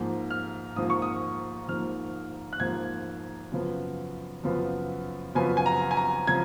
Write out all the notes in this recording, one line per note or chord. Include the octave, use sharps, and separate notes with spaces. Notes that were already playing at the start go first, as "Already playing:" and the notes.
Already playing: G#2 F3 A#3
F6
G#2 F3 A#3 D#6
C#6
D#6
G#2 F3 A#3 F6
F#6
G#2 F3 A#3 G#6
F#2 C#3 F3 B3
F#2 C#3 F3 B3
F#2 C#3 F3 B3 G#5
G#5
A#5
G#5
A#5
C#3 F3 G#6